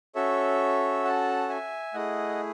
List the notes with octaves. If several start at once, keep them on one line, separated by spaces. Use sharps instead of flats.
C#4 F#4 A4 C#5 E5
F#5 A5
E5 G#5
A3 E4 G#4 D#5 F#5